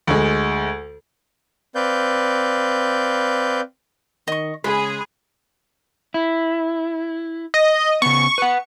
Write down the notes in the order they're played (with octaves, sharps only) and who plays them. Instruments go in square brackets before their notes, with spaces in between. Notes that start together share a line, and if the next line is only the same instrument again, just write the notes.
[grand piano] D2 G#3
[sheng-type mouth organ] C4 B4 D5 F5 G6
[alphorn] D#3 [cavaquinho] D#5 C#6
[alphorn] C#3 [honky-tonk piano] G#3 [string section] G#4 [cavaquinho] B5
[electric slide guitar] E4
[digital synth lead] D#5
[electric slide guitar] C#3 B3 [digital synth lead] C#6
[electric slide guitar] B4 F#5